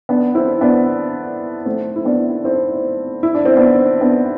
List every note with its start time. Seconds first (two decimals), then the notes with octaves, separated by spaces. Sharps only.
0.09 B3 D4
0.35 C4 E4
0.61 B3 D4
1.66 A3 C4
1.96 E4
2.05 B3 D4
2.44 C4 E4
3.23 E4
3.34 D4
3.45 C4
3.57 B3 D4
4.01 B3 D4